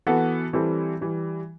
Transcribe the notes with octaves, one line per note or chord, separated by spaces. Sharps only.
E3 B3 F#4 A4
E3 G3 C4 E4 A4
E3 G3